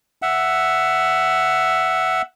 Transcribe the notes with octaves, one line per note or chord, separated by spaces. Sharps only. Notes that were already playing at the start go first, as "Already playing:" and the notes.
E5 F#5